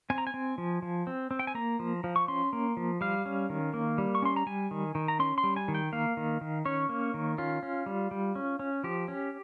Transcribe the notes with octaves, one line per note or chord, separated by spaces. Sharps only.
C4 G#5
A#5
G#5
C4
F3
F3
C4
C4
G5
G#5
A#3 A#5
F3
F3
C#6
C#4 C6
A#3
F3
G3 F5
C#4
D#3
A#3
G3
C#6
C#4 C6
A#5
G3 G#5
D#3
D#3
A#5
C#4 C6
C6
G3
G#5
D#3
G5
A#3 F5
D#3
D#3
C#4 C#5
A#3
D#3
C#4 F4
C#4
G3
G3
C#4
C#4
F3 G4
C#4